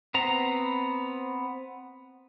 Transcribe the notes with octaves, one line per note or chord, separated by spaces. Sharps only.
B3 C4 A#5